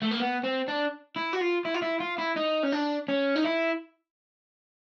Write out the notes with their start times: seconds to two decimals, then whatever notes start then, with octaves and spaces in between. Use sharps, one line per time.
0.02 A3
0.11 A#3
0.20 B3
0.44 C4
0.68 D4
1.16 E4
1.33 F#4
1.41 F4
1.65 E4
1.74 F4
1.82 E4
2.00 F4
2.19 E4
2.36 D#4
2.63 C#4
2.72 D4
3.08 C#4
3.36 D#4
3.45 E4